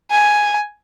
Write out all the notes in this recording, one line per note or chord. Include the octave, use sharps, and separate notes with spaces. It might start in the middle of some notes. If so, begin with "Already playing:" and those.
G#5